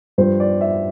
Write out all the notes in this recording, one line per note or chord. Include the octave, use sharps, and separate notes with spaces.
G2 F3 C5
D5
E5